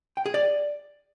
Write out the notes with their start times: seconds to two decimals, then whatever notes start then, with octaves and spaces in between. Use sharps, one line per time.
0.17 G5
0.26 G#4
0.34 D5